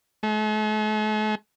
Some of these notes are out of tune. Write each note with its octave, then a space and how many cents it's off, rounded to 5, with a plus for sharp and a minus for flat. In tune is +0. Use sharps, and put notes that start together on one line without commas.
A3 -45